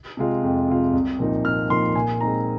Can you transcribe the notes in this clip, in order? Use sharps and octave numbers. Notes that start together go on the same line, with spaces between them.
C3 G#3 F4
F2
C3 G#3 F4
C2
A#2 F3 A#3 D#4
C2 F6
A#2 F3 A#3 D#4 C6
A#2 G#5
G#3 C4 D#4 A#5